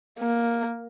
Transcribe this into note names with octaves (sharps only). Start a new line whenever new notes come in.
A#3